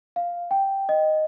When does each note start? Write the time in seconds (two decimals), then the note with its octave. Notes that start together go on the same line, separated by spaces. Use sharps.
0.16 F5
0.51 G5
0.89 D#5